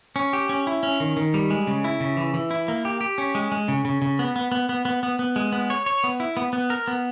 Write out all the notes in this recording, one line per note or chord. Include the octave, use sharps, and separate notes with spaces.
C#4
G4
C#4
E4
C#4
D#3
D#3
G3
G#3
C#3
E4
C#3
E3
E3
E4
A#3
G4
G4
C#4
G#3
G#3
C#3
C#3
C#3
B3
B3
B3
B3
B3
B3
B3
G#3
B3
C#5
C#5
B3
E4
B3
B3
A#4
B3